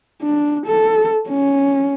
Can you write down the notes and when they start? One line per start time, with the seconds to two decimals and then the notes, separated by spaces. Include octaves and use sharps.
0.22 D4
0.66 A4
1.29 C#4